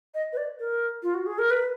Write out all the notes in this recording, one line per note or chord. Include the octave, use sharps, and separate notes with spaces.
D#5
B4
D5
A#4
F4
F#4
G#4
A#4
B4